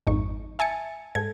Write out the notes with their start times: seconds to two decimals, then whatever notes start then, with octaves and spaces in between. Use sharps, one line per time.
0.07 G#1 F2 G#2 D#4 C#6
0.59 E5 G#5 A5 A6 C#7
1.15 G#2 A4 G#6